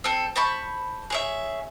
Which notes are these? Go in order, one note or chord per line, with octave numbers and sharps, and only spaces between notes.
C4 A4
C5 A5 B5 C#6
G#4 C#5 E5